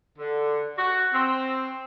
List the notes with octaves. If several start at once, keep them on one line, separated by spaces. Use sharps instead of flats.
D3
F#4
C4